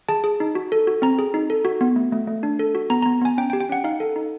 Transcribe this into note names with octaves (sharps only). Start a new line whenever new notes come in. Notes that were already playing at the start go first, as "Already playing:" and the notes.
G#4 A5
G#4
D#4
F#4
A4
F#4
C4 A#5
G#4
D#4
A4
F#4
B3
A3
A3
A3
D4
A4
F#4
B3 A#5
B3 A#5
B3 G#5
C#4 G5
G5
G4
G5
C#4 F#5
D#4 F5
A4
D#4